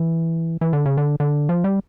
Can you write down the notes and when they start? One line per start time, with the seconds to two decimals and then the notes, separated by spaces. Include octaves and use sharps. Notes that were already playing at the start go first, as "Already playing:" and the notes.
Already playing: E3
0.61 E3
0.73 D3
0.86 C#3
0.97 D3
1.20 D3
1.49 F3
1.64 G3